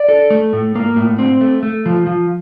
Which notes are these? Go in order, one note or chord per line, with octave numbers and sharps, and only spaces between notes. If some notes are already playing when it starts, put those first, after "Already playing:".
Already playing: D5
A4
A3
A2
A#3
A2
C4
A3
A3
F3
F3